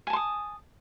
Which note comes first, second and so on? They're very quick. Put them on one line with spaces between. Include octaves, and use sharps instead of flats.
G#5 A5 C6 D#6